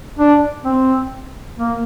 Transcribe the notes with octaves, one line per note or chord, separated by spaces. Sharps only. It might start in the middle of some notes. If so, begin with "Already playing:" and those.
D4
C4
A#3